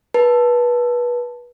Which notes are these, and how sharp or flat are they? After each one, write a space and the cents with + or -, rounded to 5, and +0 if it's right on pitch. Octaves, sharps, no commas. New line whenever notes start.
B4 -25 A5 +0